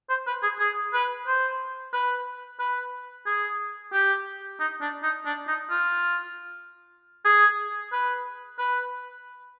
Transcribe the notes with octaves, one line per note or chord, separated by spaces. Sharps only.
C5
B4
G#4
G#4
B4
C5
B4
B4
G#4
G4
D#4
D4
D#4
D4
D#4
F4
G#4
B4
B4